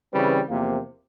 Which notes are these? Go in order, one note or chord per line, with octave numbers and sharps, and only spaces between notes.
C#3 E3 G3 C4 B4
E2 C3 F3 A#3